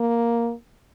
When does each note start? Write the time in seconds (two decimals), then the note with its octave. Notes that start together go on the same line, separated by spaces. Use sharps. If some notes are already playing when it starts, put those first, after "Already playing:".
Already playing: A#3